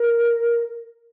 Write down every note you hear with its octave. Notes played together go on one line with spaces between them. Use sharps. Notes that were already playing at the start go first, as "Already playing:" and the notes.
Already playing: A#4